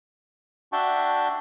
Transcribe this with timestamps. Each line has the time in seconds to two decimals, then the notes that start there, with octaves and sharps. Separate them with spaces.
0.73 D4 F#4 E5 G5 A5 C#6